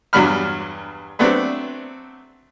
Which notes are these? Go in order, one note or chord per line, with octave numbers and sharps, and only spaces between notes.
E2 G2 F#3 G3 B5 F6
F#3 A3 B3 C4 D4